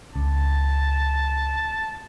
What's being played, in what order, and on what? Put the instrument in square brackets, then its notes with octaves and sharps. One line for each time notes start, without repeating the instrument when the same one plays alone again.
[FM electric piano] C#2 [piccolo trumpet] A5